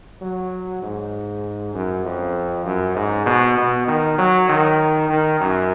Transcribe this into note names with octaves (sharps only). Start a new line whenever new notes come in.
F#3
G#2
F#2
F2
F#2
G#2
B2
B2
D#3
F#3
D#3
D#3
F#2